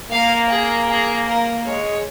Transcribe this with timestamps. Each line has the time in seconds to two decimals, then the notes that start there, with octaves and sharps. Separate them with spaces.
0.11 A#3 F5
0.50 G#4
0.88 G#4
1.27 A#4
1.65 G#3 C#5